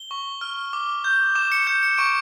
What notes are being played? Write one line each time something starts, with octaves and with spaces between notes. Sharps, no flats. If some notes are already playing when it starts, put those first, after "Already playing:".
Already playing: G7
C#6
F6
D6
G6
D6 E7
C#7
G6 C#7
C#7
C#6 D7